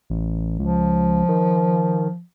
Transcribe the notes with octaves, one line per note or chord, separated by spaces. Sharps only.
A1
C#2 F3
D#3